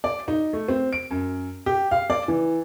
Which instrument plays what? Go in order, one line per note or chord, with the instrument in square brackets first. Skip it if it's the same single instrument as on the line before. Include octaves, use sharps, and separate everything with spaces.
[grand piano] D5
D#4
A3
C4
D7
F#2
G4
F5
D5
E3